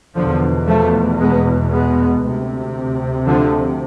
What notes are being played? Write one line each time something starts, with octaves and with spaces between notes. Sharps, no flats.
E2 B2 D3 F3
F3 A3
G#3 B3
G#3 B3
D2 C3
D3 F3